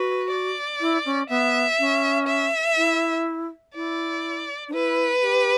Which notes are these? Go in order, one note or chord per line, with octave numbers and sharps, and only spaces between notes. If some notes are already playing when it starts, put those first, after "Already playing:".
Already playing: F#4 B4
D5
E4
C#4
B3 E5
C#4
E5
E4
E4 D5
D4
E4 B4
G4